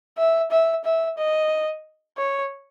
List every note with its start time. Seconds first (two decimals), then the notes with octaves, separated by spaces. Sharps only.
0.18 E5
0.51 E5
0.85 E5
1.18 D#5
2.18 C#5